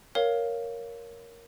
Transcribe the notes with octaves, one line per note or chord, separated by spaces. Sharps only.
A#4 C#5 F5